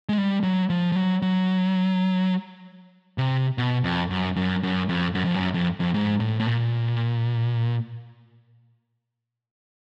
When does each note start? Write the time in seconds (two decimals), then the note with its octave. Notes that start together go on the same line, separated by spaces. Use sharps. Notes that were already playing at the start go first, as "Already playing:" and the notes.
0.09 G#3
0.18 G3
0.43 F#3
0.70 F3
0.92 F3
0.96 F#3
1.22 F#3
3.18 C3
3.58 B2
3.84 F2
4.10 F#2
4.36 F#2
4.63 F#2
4.89 F2
5.15 F#2
5.25 F2
5.35 F#2
5.54 F2
5.80 F2
5.94 G#2
6.20 A2
6.40 A2
6.46 A#2